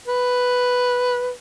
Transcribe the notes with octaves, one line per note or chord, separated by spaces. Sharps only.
B4